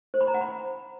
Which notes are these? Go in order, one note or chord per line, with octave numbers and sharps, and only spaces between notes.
C5
B5
A#5
F#5
B5